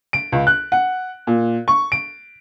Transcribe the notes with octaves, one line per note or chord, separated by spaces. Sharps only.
D7
C#2
F#6
F#5
A#2
C#6
D7